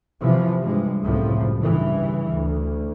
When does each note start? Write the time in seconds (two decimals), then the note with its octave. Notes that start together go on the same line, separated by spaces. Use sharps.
0.21 C3 E3 F3
0.63 G2 G#3
1.03 F#1 C#2 A2 C3 F3
1.60 G2 C#3 E3
2.32 D2